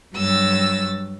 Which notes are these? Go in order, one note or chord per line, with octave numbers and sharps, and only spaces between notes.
G2 F#3 E6 A6